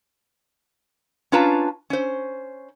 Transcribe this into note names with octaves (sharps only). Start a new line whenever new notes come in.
C#4 D4 F4 B4 A5 A#5
C#4 C5